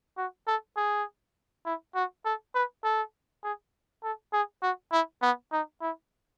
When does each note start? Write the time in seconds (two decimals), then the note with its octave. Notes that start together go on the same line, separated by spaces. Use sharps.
0.17 F#4
0.47 A4
0.77 G#4
1.65 E4
1.95 F#4
2.25 A4
2.55 B4
2.84 A4
3.44 G#4
4.03 A4
4.33 G#4
4.63 F#4
4.92 E4
5.22 B3
5.52 D#4
5.82 E4